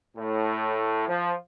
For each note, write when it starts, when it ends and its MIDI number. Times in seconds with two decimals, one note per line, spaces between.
0.17 1.06 45
1.08 1.33 53